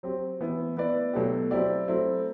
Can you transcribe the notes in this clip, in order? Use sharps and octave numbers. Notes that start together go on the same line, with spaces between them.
F#3 C4 G4
E3 B3 E4
B3 E4 B4 D5
B2 F#3 A3 E4 G4
F#3 C4 E4 G4 D5
F#3 A3 C4 E4